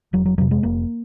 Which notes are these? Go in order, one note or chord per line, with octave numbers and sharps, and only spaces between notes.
F1 F#3
F#3
F2 C3 F#3
G#3
F1 A#3